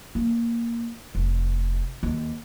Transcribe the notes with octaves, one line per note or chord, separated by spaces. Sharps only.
A#3
F1
D#2